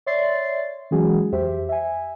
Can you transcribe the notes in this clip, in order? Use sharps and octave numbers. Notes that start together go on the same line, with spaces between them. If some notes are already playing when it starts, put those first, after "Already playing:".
C#5 D5 E5 C6 A6 C7
E3 F#3 G#3 C#4 F#4 G#4
F2 G4 C5 E5
E5 G#5